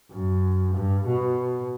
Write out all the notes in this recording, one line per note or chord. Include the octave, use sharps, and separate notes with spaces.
F#2
G2
B2